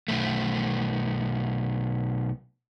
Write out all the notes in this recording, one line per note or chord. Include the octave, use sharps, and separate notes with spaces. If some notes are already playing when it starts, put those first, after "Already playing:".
B1 A3